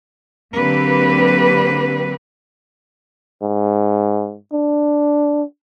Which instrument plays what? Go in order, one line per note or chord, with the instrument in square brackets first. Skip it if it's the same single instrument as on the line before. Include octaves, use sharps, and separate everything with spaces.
[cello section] D3 F#3 A#3 C4 G4 B4
[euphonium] G#2
D4